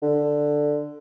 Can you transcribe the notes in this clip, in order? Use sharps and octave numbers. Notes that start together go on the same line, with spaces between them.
D3